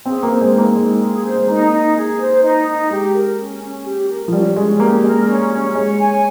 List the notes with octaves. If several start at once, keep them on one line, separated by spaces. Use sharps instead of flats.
C4 G#4
A#3
C5
G#3
D#4
A#3
G#3 D#4
G#4
C5
G#3
A#3 D#4
D#4
G#4
C5
D#4
D#4
G#3 G4
A#4
C#4
C#4
G4
A#4
F3
G3 C#4
G#3 C#4
A#3 G4
G#3 A#4
C#4
C#4
G#3 C#5
G#5